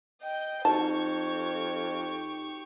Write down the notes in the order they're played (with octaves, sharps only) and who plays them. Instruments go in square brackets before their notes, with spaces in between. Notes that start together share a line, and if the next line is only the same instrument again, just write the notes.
[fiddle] D#5 G5
[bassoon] F2 [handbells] D#4 F#4 [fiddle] G4 C#6 [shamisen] A5